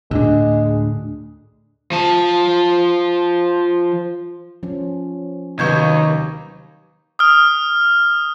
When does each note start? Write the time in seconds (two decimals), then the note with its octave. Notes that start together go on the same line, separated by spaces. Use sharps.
0.11 D2 A2 G#3 D4
1.91 F3 A5
4.63 F3 C#4
5.59 D#2 C3 F#3 D#4 B4 C#6 G6 G#6
7.19 D#6 F6